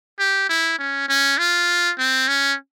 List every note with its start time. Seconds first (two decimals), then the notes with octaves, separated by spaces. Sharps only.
0.19 G4
0.49 E4
0.79 C#4
1.09 C#4
1.38 F4
1.98 C4
2.28 C#4